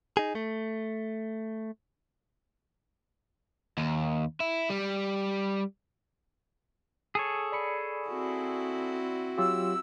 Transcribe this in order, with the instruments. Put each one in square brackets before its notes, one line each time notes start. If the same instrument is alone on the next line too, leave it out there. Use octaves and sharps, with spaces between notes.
[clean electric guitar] D#4 G#4
A3
[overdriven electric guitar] D#2
E4
G3
[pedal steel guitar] G#4 A4 C#5
[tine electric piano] D5 B5 C#7
[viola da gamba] C4 E4 F#4
[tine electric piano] F#3 F4 G4 [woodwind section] E6